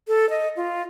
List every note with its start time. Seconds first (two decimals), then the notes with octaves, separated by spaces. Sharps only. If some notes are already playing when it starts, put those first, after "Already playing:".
0.08 A4
0.30 D#5
0.56 F4